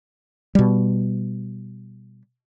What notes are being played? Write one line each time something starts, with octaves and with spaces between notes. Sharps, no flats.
B2 G3